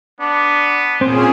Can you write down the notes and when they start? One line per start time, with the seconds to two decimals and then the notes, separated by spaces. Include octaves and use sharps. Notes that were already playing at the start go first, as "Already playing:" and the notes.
0.21 B3 D4
1.01 A#2 C4 C#4 G#4 C5